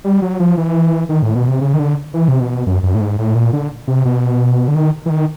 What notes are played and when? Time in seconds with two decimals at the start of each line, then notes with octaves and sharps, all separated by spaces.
0.04 G3
0.22 F#3
0.40 F3
0.57 E3
1.09 D#3
1.22 A2
1.35 B2
1.48 C3
1.61 C#3
1.74 D#3
1.79 D3
2.14 E3
2.28 C3
2.40 B2
2.67 F#2
2.83 F#2
2.95 A2
3.01 G#2
3.18 A2
3.35 A#2
3.53 D3
3.88 C3
4.05 B2
4.68 D3
4.75 D#3
5.06 E3
5.10 D#3